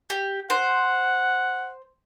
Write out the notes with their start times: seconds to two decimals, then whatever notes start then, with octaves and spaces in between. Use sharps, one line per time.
0.10 G4
0.50 C5 F#5